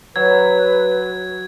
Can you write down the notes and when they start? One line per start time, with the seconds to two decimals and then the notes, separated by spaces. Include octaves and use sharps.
0.16 F#3 B4 G#6